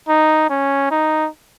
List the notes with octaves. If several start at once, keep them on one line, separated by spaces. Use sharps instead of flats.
D#4
C#4
D#4